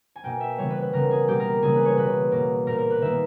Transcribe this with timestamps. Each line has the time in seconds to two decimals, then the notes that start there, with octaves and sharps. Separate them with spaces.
0.16 G#5
0.23 B2 A#3 G5
0.41 E5
0.58 C#3 E3 G3 B3 C#5
0.71 B4
0.81 B4
0.93 C#3 G3 B3 A#4
1.11 G#4
1.28 B2 G3 A#3 G4
1.40 A#4
1.62 C#3 E3 G3 A#3 G#4
1.74 B4
1.85 C#5
1.97 B2 A#3 B4
2.32 B2 A#3
2.67 A#2 A#3 A#4
2.79 A#4
2.90 B4
3.01 D#3 G3 A#3 E5